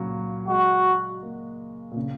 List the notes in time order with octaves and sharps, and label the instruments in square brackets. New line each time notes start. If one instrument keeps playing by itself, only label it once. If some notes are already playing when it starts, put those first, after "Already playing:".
Already playing: [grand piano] A#2 C#3 F#3
[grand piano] G#3 [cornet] F#4
[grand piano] A#3
A#2
C#3